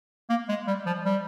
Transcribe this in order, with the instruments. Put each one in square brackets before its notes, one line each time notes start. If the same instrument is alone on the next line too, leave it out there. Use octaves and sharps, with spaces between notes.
[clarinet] A#3
G#3
G3
F3
G3